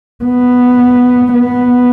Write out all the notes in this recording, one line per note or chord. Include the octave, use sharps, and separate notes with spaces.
B3
B3